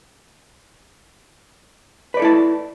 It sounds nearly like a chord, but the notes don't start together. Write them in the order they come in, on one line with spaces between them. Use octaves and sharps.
B4 D5 A4 E4 A5